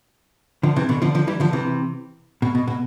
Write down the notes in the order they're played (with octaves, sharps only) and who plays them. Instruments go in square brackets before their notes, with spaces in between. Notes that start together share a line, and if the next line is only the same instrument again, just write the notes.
[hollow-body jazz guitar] D3 F3
C3 E3
B2 D3
D3 F3
D3 F3
E3 G3
D3 F3
C3 E3
B2
B2
B2